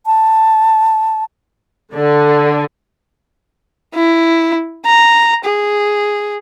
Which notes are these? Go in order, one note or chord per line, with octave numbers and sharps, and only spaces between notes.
A5
D3
E4
A#5
G#4